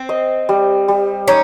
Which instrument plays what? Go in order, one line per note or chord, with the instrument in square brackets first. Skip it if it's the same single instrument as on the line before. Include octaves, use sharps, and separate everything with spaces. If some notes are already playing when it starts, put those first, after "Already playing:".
Already playing: [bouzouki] C4
[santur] D#5
G3
G3
[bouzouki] C#4 [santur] D#4